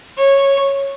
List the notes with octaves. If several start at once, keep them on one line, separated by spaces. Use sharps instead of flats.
C#5